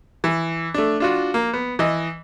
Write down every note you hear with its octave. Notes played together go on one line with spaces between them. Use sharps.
E3
A3 D4
D4 F4 F#4
A#3
B3
E3 D#5